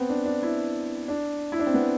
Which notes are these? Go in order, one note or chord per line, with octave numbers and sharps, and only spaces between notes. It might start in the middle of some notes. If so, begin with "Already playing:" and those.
Already playing: B3 C4
D4
D4
E4
D4
E4
D4
C4
B3